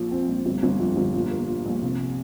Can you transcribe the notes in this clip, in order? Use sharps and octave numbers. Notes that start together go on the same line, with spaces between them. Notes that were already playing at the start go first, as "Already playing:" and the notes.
Already playing: A#1 F3
C4
A#1
G1
G1
F2
G1
A#2
A#3
F4
A#1
C3